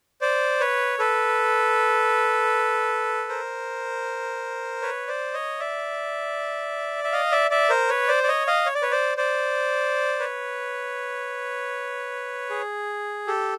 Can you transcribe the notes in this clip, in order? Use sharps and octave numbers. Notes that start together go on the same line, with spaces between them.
C5 D5
B4 C#5
A4 B4
A#4 C5
B4 C#5
C5 D5
C#5 D#5
D5 E5
E5
D#5 F5
D5 E5
D5 E5
A#4 C5
B4 C#5
C5 D5
D5
C#5 D#5
D#5 F5
C#5
D5
B4 C#5
C5 D5
C5 D5
B4 C#5
G#4
G4 A4